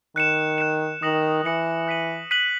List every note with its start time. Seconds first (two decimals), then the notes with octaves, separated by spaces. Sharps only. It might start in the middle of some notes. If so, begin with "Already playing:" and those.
0.16 D#3 F#6 C#7 E7
0.58 F#6 C#7 E7
1.02 D#3 D#6 A#6 C#7 F#7
1.45 E3 D#6 A#6 C#7 F#7
1.88 F#6 B6 D#7 F#7
2.31 F#6 B6 D#7 F#7